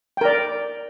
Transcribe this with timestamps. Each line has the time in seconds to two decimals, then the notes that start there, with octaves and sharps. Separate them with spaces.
0.17 G5
0.21 A#4
0.25 D5